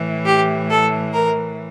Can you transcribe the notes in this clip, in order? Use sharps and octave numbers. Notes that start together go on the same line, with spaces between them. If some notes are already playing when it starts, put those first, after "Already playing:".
Already playing: A2 E3
G4
A4
A#4